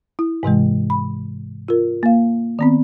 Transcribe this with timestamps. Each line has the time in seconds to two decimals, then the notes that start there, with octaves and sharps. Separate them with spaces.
0.19 E4
0.43 G#2 C3 E3 G#3
0.90 B5
1.68 F4 A#4
2.03 A#3 F5
2.59 D#3 B3 C4